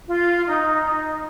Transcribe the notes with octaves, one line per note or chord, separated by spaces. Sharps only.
F4
D#4
D#4